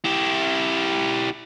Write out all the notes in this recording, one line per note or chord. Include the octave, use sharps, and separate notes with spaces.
E4 G4